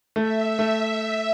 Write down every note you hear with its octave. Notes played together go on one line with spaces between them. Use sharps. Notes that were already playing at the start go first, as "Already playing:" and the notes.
A3 E5
A3